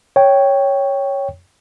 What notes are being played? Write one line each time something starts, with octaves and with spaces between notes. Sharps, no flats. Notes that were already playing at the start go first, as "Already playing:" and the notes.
C#5 G5